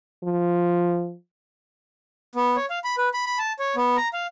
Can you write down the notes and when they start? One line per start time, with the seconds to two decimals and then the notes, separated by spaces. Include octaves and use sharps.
0.24 F3
2.34 B3
2.56 C#5
2.70 F5
2.84 B5
2.98 B4
3.14 B5
3.26 B5
3.39 A5
3.59 C#5
3.76 B3
3.97 A#5
4.13 F5